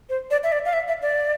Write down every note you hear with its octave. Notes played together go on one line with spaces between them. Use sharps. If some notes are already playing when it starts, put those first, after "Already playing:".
C5
D5
E5
D5
F5
E5
E5
D5